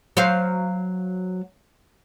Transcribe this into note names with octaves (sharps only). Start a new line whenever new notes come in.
F#3 C5 F5